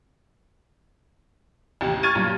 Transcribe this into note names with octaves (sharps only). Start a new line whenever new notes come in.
A1 D#2 C3
C#6 F6 G#6 A6 D#7
B1 G2 A#2